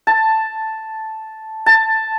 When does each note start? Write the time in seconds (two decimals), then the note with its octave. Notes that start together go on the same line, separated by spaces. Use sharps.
0.07 A5
1.66 A5